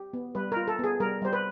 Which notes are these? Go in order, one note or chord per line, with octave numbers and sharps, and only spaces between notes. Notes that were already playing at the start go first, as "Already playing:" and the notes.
Already playing: G4
B3
G3 B4
F4 A#4
A4
B3 G#4
G3 A#4
G3 C5
B4